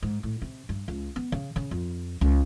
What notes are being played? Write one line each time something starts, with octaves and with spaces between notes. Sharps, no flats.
G#2
A2
C3
G2
C#2
B3
C#3
C#3
F2
C#2